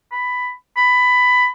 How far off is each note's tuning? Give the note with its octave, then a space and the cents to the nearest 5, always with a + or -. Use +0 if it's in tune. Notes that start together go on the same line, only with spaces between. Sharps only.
B5 +10
B5 +15